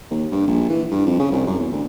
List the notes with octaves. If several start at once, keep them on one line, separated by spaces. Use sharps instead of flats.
D#2
G2
A#1
E3
G2
F2
C#3
C2
F#2
E2
D2